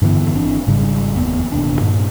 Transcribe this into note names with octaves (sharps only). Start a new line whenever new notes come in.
G2 D3 E3 B3
G#1 E3 C4 D4
G#1 G#2 C#3 G3
F1 D#2 B3
D1 D#2 B2 D4
G2 A#2